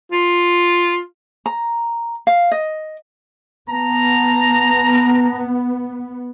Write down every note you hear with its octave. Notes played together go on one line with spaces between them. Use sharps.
F4
A#5
F5
D#5
B3 A5 A#5